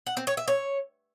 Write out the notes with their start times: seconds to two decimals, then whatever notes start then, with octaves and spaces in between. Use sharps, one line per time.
0.06 F#5
0.17 C4
0.27 C#5
0.37 E5
0.48 C#5